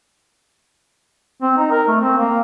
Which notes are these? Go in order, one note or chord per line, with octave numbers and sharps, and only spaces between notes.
C4
D#4
A#4
A3
C4
A#3